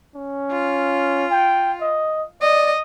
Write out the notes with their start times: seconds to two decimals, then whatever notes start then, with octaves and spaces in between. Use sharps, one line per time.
0.15 C#4
0.51 F4
1.31 G5
1.81 D#5
2.41 D5 D#5